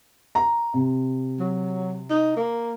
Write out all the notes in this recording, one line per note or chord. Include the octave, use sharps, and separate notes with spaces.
A#5
C3
F#3
D#4
A#3